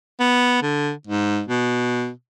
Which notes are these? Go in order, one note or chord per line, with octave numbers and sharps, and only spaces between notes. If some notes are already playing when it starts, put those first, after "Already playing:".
B3
D3
G#2
B2